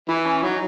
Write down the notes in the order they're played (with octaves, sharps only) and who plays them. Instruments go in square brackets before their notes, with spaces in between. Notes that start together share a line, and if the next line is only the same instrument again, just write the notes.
[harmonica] E3 [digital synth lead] E4
[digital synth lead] C#4
[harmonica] F#3 [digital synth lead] D#4